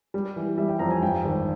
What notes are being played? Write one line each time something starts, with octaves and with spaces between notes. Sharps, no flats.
G3
E3
G3 E5
G5
F2 A#5
G#5
G2 G5
G#1